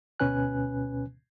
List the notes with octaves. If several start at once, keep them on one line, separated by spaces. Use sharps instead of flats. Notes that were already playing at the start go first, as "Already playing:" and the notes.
D2 B2 C#4 B4 G#5 F#6